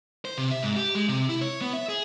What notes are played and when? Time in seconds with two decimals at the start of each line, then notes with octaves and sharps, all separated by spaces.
0.25 C5
0.38 C3
0.51 E5
0.63 G#2
0.76 G4
0.95 G#3
1.08 C3
1.29 E4
1.42 C#5
1.61 B3
1.73 E5
1.89 G#4